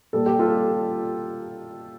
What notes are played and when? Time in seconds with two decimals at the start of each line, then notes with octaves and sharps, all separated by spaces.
0.13 A#2 G3 A4
0.26 G4
0.39 F4 A4